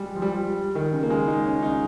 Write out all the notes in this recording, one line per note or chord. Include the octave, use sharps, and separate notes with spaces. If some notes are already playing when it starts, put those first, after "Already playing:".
Already playing: G3 G#3
F3
G3
D#3
C#3
A#3
G#3
D#4
C#4
D#4